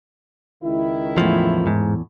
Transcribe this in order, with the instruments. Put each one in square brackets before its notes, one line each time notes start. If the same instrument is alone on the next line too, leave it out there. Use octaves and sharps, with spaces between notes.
[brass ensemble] C#2 D#3 E4
[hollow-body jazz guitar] E2 A2 [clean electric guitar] F3
[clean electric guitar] G#2